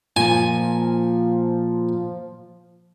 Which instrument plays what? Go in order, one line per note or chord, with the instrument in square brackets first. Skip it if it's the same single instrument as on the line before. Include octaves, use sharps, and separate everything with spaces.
[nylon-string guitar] A#2 [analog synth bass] F3 [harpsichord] G#5